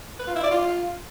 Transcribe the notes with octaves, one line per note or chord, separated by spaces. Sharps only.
B4
F4
E4
D5
F4